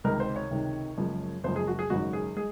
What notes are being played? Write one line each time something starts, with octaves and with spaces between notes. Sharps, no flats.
C#2 C3 D#3 G#3 D#4 A#4
C5
C#5
C#2 C3 D#3 G#3 D#4
F#1 F#2 C#3 F3 G#3
F#1 F#2 C#3 F3 G#3 C5
G#4
F#4
G#4
G#1 F#2 C#3 G#3 F#4
G#4
G#3 G#4